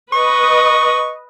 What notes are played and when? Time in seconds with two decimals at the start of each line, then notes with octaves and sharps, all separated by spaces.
0.13 B4 D#5 C#6